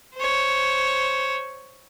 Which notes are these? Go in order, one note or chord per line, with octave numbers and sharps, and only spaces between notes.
C5 C#5